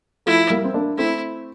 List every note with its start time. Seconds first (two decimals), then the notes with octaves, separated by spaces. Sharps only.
0.26 F3 A3 E4
0.50 G3 A#3
0.64 C4
0.74 A#3 D4
0.98 A3 C4 E4